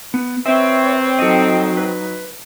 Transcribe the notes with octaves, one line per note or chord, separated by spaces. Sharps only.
B3
C4 B4 C#5 E5
F#3 D#4 A4 D#5
B4